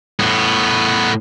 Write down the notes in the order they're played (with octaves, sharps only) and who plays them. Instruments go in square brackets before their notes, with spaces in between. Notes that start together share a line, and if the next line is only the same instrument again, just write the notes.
[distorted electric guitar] A2 B3